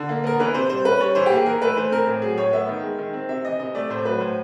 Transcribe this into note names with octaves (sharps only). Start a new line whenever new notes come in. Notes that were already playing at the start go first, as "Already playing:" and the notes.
Already playing: D3
A#3
B3 A#4
E3 B4
C3 C5
G3 C5
C#4 B4
G3 C#5
E3 C5
G4
A#3
G#4
E3 A#4
A3 B4
E3 C5
C4 A#4
A2
F#3 G#4
A2 C#5
B3 E5
D#3
G#3
D#3
C4
C3 E5
E3 D#5
C3 D#5
A3 D5
A2 C5
F#3 B4
A2 C5